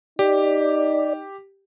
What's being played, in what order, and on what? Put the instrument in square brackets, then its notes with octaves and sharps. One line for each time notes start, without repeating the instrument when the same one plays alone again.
[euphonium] D#4 [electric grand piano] G4 [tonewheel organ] D5